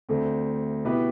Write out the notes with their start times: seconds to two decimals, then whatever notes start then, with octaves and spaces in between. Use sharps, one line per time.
0.09 D2 D3 A3 C4
0.85 B2 B3 E4 G4 B4